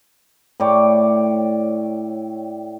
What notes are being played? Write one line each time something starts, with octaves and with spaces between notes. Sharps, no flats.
A2 C#5 D5 G5